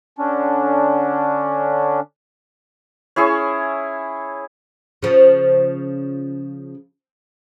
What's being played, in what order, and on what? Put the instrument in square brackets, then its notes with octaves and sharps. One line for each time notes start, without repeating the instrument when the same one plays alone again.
[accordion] D3 C#4 D4
[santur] C#4 E4 G#4 C#5
[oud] C#3 F3